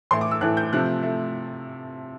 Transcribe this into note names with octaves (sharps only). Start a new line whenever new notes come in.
A2 E3 A3 C6
D6
E6
A2 E3 A3 F#6
G6
C3 F3 A3 F#6
A3